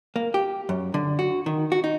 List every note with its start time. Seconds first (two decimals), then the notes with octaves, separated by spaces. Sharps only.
0.16 A#3
0.34 G4
0.69 F#2
0.94 D3
1.19 F#4
1.46 D#3
1.72 F#4
1.84 D#4